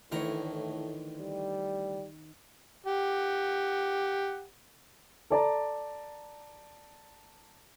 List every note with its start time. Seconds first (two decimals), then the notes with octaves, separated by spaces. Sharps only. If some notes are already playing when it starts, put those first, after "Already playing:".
0.12 D2 A2 D#3 E3 C#5 A#5
1.19 G3
2.86 G4 F#5
5.30 A4 D5 A5 A#5